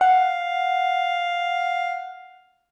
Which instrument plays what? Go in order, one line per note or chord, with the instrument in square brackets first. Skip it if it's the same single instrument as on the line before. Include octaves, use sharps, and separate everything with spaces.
[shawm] F5 [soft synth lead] F#5